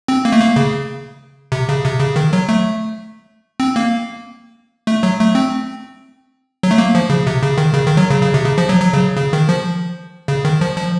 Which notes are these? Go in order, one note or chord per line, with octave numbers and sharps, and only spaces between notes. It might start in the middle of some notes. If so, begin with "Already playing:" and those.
C4
A#3
A3
A#3
C#3
C3
C#3
C3
C#3
D#3
F#3
A3
C4
A#3
A3
F#3
A3
C4
F#3
A3
A#3
F3
C#3
C3
C#3
D#3
C#3
D#3
F#3
C#3
C#3
C3
C#3
F3
F#3
F#3
C#3
C#3
D#3
F3
C#3
D#3
F3
F3